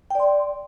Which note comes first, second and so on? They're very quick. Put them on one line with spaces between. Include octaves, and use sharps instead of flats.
G5 D5 C6